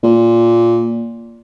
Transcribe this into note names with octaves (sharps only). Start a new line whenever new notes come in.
A#2